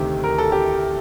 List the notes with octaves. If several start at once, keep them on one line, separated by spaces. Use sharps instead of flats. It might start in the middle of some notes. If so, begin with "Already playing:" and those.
Already playing: D2 C3 D#3 G4
A#4
A4
G4